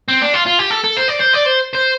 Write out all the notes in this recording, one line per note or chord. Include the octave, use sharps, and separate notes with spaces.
C4
D4
F4
F4
G4
A4
A4
C5
D5
C5
D5
C5
C5